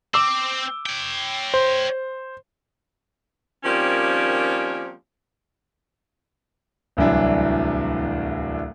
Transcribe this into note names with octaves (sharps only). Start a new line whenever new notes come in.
C4 D6 E6
C#5 G5
C5
D#3 F3 G3 A#3 C4 C#4
D1 C2 E3 F#3 D4 E4